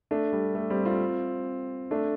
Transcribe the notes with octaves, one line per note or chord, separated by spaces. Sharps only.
A3 D4
G3
A3
G3 C4
C4 F4
A3 D4